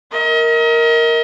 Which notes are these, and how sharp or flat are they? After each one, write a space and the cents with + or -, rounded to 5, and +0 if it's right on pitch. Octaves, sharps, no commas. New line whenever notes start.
A#4 -5 D#5 +40